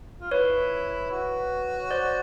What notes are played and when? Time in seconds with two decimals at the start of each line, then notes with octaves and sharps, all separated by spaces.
0.20 F4
0.31 E4 B4 C#5
1.11 F#4
1.91 C5 D5